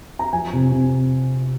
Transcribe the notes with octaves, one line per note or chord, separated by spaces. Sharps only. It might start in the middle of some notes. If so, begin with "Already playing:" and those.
A#5
F3 G#5
C3
C3